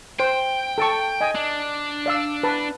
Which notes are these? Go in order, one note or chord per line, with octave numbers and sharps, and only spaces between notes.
C5 G5
A4 A5 C#6
D#5 G#5
D4
D5 F5 E6
B4 A5